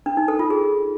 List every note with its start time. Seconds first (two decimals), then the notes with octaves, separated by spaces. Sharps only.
0.06 D4
0.17 D#4
0.28 A4
0.39 F4
0.50 G#4